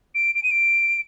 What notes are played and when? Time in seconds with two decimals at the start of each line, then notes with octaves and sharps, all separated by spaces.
0.15 D7
0.35 D7
0.43 D#7
0.51 D7